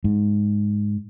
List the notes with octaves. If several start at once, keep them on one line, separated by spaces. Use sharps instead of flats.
G#2